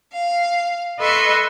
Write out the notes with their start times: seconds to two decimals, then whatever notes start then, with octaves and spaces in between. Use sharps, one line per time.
0.14 F5
1.00 A4 B4 D#5 E5 C6 C#6